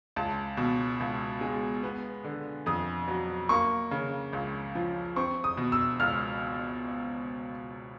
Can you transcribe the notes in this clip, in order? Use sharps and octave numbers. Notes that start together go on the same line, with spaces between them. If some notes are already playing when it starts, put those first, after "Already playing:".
C#2 A5
B2
C#2
G#3
B3
D3
F2 D#6
F#3
A#3 C#6
C#3
C#2
F3
C4 C#6
D#6
B2
E6
C#2 F6